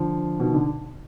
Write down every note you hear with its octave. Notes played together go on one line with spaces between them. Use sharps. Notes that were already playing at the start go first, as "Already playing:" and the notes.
Already playing: D3 F3
B2 D#3
D3